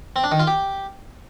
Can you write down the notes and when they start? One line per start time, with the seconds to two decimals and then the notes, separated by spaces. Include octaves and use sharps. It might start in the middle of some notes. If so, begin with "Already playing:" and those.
0.16 C4
0.24 D4
0.32 D#3
0.40 F4
0.47 G4